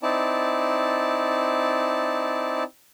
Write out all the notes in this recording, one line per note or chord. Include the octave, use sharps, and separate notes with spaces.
C4 D#4 E4 D5 A5